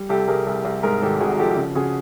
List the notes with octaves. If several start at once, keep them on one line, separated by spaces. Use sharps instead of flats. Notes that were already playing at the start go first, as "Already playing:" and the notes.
Already playing: G3
C2 G4 A4
C2 G#4 A#4
C2
C2
G#2 G#4 A#4
G#1 G4 A4
G#1 F#4 G#4
F3 G4 A4
C#3
C#3 F#4 G#4